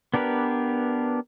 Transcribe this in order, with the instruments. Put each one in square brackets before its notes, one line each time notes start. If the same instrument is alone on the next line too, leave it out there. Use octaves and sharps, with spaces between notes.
[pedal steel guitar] B3 D4 G4 A#4 B4